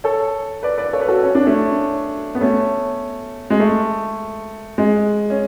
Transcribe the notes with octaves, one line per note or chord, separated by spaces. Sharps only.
A4 C#5
B4 D5
B4 D5
A4 C#5
B4
F#4 A4
C#4
D4
A3 C#4
B3
A3 C#4
G#3
A3
G#3
C#4